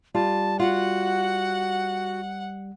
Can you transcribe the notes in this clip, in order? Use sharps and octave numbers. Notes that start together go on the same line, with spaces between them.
G3 F4 A5
F4 F#4 F#5